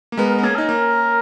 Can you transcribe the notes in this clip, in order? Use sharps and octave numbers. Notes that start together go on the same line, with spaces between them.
A#3
G#3 B3 A#4
A#4
B3
A#3 C#4 G#4
D#4 A#4
A#3 C#4